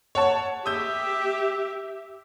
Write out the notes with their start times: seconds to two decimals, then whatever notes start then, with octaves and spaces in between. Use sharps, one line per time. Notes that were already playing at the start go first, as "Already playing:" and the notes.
0.15 C#5 F#5 A5
0.66 G4 E5 D#6 E6 G6